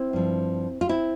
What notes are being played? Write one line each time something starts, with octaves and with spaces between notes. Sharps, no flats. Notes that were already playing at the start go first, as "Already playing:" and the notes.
Already playing: C4 E4
G2 F3
F4
C4 E4